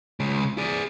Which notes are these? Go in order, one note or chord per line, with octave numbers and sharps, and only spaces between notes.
C#3 G#3
G#4 D5